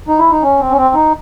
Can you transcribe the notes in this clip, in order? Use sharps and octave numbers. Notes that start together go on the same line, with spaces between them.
D#4
E4
D#4
C#4
C4
C#4
C4
D#4